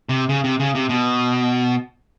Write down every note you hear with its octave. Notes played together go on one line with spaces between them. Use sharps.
C3
C#3
C3
C#3
C3
B2